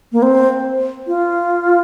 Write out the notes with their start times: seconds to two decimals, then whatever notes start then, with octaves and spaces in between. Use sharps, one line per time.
0.12 A#3
0.23 C4
1.07 F4